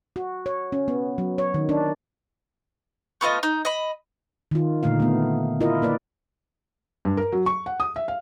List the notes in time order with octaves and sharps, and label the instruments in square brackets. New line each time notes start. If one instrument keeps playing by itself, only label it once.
[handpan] F#4
C#5
C#4
B3
F#3
C#5
D#3
D4
[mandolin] A3 B3 F4 D#5
D#4
D#5 B5
[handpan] D#3 F4
A#2 D3 A3 D#4 F5
A3 B3
E4 F4 A#4 D#5
A#3 B4 D5
[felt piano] G2
A#4
F#3
C#6
F#5
D#6
E5
F5